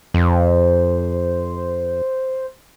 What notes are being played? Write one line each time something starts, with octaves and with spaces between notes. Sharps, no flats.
F2 C5